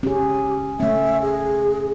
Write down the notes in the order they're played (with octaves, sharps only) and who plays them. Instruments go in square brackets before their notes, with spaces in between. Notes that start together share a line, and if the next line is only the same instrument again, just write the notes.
[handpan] C#4 G#4 [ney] G4
[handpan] A3 C#4 [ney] E5
[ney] G#4